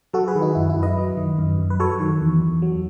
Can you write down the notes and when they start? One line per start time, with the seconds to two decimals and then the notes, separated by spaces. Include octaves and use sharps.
0.13 F#3 F#4 A4
0.28 G#4 B4
0.35 D#3
0.41 D#4 F#4
0.55 F#2 E4
0.70 E4
0.76 F#2
0.83 B4 D#5
0.97 F#3
1.17 D#3
1.39 F#2
1.59 F#2
1.70 B4
1.80 F#3 A4 C#5
2.00 D#3
2.20 E2
2.42 E2
2.62 F#3